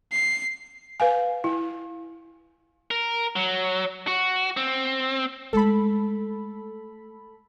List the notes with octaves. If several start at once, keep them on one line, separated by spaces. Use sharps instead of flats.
C7
B4 F5 G#5
E4
A#4
F#3
F#4
C4
G#3 A3 A4 B5